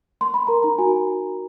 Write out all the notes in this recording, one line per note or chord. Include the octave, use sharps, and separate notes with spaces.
C6
B5
A#4 A#5
D#4 A#5
F#4 G#5